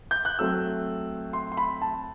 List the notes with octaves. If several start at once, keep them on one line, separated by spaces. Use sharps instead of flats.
G6
F#6
F#3 A3 C4 E6
C6
C6
B5
A5